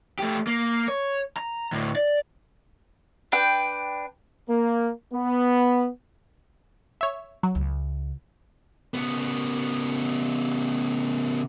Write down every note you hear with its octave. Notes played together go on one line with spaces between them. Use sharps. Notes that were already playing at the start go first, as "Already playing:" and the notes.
A3 G4
A#3
C#5
A#5
D2 A2
D5
D4 B4 G5
A#3
B3
C#5 E5
F#3
C#2
C#3 B3